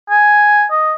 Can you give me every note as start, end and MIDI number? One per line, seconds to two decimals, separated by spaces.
0.10 0.65 80
0.71 0.94 75